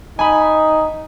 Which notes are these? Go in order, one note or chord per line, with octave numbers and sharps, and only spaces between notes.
D#4 G#5 B5